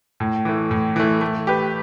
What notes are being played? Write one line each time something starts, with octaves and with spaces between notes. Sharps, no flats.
A2
E3 A3
A2
E3 A3
A3
G4 B4